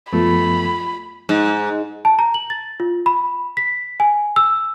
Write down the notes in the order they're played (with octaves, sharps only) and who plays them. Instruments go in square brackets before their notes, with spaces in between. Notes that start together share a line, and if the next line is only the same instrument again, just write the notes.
[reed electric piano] F#2 F3 B3 [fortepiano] A3 [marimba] F4 [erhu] B5
[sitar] G#2
[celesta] A5
A#5
F#7
A6
F4
B5
B6
G#5
E6